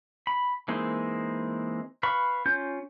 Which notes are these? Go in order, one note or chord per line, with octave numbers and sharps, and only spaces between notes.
B5
E3 G#3 A#3 C4 D#4
B4 F5 B5 C#6
C#4 F4 G6